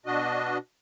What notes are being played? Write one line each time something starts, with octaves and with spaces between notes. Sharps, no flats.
B2 D4 F#4 D#5